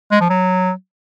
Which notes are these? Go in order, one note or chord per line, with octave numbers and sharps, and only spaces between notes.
G#3
F3
F#3